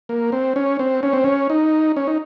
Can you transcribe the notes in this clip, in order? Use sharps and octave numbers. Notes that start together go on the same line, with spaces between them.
A#3
C4
C#4
C4
C#4
C4
C#4
D#4
C#4
D#4